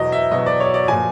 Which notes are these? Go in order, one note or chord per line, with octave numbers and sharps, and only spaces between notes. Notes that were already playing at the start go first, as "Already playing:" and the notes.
Already playing: E2 B2 F#3 D#5
E5
E2 B2 F#3 D#5
D5
C#5
D5
A#2 F3 G#5